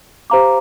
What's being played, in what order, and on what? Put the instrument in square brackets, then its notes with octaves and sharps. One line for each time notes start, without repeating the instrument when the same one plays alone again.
[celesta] G4 C5 F5 A#5 D6